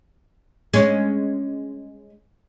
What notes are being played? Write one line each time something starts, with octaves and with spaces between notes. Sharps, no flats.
G#3 C#4